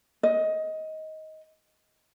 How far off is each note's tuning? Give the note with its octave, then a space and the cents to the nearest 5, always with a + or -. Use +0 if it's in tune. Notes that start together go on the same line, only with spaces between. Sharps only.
D#5 +15